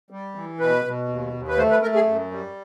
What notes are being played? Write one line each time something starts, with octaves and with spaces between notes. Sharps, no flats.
G3
E3
B2 B4
B2
D#2
D#2
B4
A3 C5
B4
A3 A#4
G#4
F#2
G3